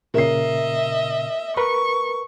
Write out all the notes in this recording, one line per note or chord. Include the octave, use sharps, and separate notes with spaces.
A#2 C#3 A#4 D#5 E5 C7
A#4 B4 C#6